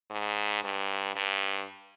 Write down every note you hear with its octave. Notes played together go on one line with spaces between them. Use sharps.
G#2
G2
G2